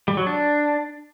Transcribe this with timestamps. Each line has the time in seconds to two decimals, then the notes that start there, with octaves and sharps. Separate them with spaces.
0.08 G3
0.17 F#3
0.27 D4